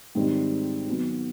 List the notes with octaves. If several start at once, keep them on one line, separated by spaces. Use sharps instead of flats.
G#2 D#3 G3 C4 D#4
D#3 F#3 B3